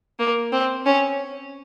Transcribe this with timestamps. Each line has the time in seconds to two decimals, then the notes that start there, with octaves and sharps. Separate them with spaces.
0.19 A#3
0.52 C4
0.86 C#4